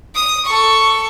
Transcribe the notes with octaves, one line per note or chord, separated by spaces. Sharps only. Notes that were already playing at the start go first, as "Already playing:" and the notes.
D#6
A4 C#6